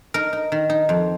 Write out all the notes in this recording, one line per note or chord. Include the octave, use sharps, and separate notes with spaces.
D#4 A#4
D#4
D#3
D#4
F2